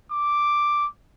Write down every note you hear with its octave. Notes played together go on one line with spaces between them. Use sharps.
D6